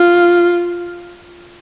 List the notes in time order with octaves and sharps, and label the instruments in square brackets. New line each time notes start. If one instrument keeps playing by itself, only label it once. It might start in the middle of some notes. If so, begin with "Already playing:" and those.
Already playing: [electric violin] F4